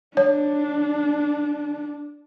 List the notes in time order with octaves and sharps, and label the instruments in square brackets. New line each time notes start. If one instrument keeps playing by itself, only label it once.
[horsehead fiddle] D4 [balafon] C#5